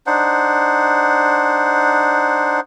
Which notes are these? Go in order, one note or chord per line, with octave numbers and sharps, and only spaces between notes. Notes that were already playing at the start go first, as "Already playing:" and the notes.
D4 D#4 C5 F#5